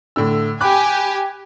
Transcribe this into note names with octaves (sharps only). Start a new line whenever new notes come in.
A2 D3 E6
G4 G#5 B5 D6 F#6